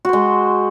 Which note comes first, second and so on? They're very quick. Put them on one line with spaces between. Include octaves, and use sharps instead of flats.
F#4 C5 G#3